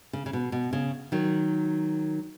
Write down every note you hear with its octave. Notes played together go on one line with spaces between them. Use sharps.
C#3
C#3
B2
B2
C#3
D#3 F#3